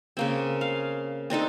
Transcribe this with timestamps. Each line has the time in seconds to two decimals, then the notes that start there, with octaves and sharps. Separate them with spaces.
0.17 C#3 A#3 C4
0.61 F5
1.30 C4 D4 D#4 A4